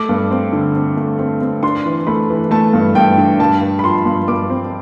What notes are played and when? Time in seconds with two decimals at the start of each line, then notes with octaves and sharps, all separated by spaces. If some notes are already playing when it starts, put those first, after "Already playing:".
Already playing: A3 D6
0.09 G2
0.31 C4
0.53 D3
0.75 C4
0.97 A3
1.19 C4
1.42 C4
1.63 D4 C6
1.86 E3
2.07 A3 B5
2.30 E3
2.51 A3 A5
2.73 G2
2.95 G2 G5
3.18 D4
3.40 G2 A5
3.61 G2
3.79 B5
3.84 F3 C6
4.06 G2
4.28 G2 D6
4.50 C4